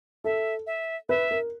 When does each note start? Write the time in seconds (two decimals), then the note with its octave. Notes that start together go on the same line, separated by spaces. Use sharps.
0.24 A4 E5
0.67 E5
1.09 B4 E5
1.31 A#4